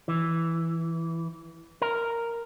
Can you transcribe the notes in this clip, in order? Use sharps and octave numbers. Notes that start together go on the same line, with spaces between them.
E3
A#4